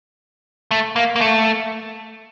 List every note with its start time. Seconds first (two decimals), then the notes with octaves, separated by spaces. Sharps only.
0.71 A3
0.96 A#3
1.16 A#3
1.21 A3